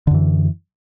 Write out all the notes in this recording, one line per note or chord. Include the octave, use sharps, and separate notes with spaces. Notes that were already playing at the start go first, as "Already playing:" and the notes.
F#2 D3 E3